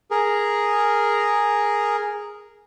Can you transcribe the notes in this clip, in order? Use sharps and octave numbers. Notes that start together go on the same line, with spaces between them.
G#4 A#4